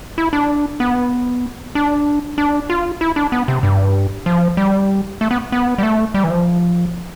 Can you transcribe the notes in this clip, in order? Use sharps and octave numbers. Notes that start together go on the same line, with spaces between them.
E4
D4
B3
D4
D4
F4
E4
D4
B3
C3
G2
F3
G3
A3
B3
B3
G3
A3
G3
E3
F3